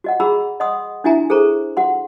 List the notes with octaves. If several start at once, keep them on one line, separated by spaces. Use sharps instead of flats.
F#4 D#5 F#5
F#4 G#4 A#5 B5 E6
D#5 F#5 C6 D#6
D4 E4 F#4 E5 G#5 A#5
G#4 A4 C5 A#5 C#6
F#4 F#5 C6